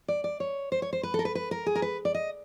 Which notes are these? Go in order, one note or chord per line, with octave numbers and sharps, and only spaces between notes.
D5
D5
C#5
C5
C#5
C5
B4
A4
A#4
B4
B4
A#4
G#4
A#4
B4
D5
D#5